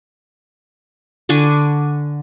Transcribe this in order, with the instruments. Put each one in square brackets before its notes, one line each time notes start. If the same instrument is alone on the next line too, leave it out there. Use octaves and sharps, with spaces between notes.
[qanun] D3 D4 G#5 C#6